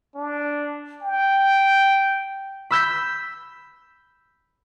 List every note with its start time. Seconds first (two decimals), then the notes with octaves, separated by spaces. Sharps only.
0.15 D4
1.02 G5
2.71 B5 E6 G6 B6